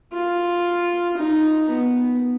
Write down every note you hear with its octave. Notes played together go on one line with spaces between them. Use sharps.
F4
D#4
B3